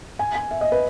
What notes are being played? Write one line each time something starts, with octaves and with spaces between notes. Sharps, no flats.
G#5
G#5
E5
D#5
B4